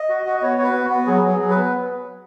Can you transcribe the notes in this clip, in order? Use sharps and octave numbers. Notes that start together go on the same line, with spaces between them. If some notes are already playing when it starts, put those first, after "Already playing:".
Already playing: D#5
F#4
F#4
D#5
B3 C#5
F#4 C#5
B4
B3
F#4
B3
F#3 G#4
F#3 G#4
F#3
B4
B3